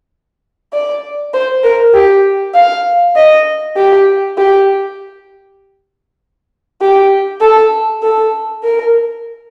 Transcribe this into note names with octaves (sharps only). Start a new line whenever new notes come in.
D5
C5
A#4
G4
F5
D#5
G4
G4
G4
A4
A4
A#4